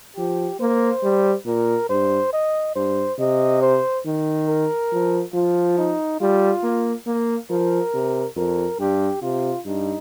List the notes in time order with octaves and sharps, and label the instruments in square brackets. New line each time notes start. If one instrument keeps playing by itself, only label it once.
[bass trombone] F3 [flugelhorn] G4
[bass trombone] A#3 [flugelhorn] C5
[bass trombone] G3
[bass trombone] A#2 [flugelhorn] A#4
[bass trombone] G2 [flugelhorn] C5
[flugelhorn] D#5
[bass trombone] G2 [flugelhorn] C5
[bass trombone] C3 [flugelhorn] D#5
[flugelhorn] C5
[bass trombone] D#3
[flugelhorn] A#4
[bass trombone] F3
[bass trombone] F3 [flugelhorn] F4
[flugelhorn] D#4
[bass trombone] G3 [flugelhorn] F4
[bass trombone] A#3
A#3
[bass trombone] F3 [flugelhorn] A#4
[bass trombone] C3
[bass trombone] F2 [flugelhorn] A#4
[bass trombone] G2 [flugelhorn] G4
[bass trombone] C3 [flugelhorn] F4
[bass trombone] G2 [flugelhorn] D#4